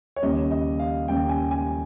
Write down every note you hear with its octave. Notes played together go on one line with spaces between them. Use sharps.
C#5
D#2 C#3 G3 C#4 D#5
D#5
F5
D#2 C#3 G3 C#4 G5
G#5
G#5